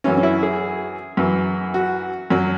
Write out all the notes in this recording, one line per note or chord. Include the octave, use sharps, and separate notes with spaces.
F#2 E3 C#4
C#4
E4
G#4
F#2 E3
F#4
F#2 F#3